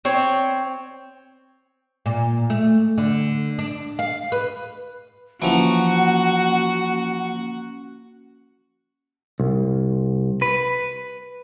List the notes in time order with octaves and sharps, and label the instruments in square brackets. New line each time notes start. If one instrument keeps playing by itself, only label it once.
[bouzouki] C4 C#5
[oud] A#2
A3
D3
D4
F5
B4
[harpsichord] E3 F3 [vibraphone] A#3 C#4 [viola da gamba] F#4 [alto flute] F#5
[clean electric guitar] C2
B4